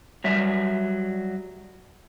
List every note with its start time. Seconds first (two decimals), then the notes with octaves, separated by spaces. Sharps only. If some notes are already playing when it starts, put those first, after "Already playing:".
0.24 F#3 G3 E5